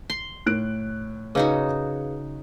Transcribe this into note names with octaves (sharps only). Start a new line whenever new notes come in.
C6
A2 F#6 D7
C#3 D#4 F#4 G#4 B4 F5